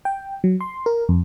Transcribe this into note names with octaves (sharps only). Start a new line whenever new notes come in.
G5
F#3
C6
A#4
F2